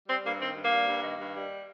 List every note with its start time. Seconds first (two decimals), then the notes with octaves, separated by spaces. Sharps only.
0.08 G3 C4
0.24 G2 A#3
0.40 D#3 C4
0.56 G2
0.64 A#3
0.72 G3
0.88 G2
1.03 D#3
1.19 G2
1.35 G3